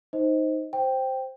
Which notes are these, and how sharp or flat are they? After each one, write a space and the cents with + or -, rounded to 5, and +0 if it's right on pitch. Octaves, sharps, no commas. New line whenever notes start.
D#4 +0 C5 +0 D#5 +25
C5 +0 G5 +0